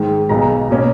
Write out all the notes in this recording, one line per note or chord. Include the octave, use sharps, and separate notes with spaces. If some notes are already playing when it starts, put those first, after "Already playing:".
Already playing: G#2 D#3 G#3
B1 B2 G#3 A#5
B2 A#3 C#4